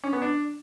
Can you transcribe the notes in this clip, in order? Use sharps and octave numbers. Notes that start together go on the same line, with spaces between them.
C#4
B3
D4